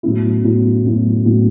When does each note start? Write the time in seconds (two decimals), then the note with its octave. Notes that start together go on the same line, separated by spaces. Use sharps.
0.03 A2 F#3 B3 E4
0.44 A2 F#3 B3 E4
0.84 A2 F#3 B3 E4
1.25 A2 F#3 B3 E4